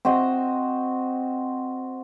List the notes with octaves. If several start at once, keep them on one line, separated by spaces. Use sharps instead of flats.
C4 F#4 D#5